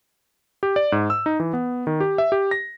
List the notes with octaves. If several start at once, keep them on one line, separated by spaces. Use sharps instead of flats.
G4
D5
G#2
E6
D#4
E3
B3
D#3
G4
E5
G4
A#6